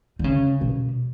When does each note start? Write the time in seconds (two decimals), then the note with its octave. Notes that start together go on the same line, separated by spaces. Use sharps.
0.19 D3
0.24 C#3
0.61 B2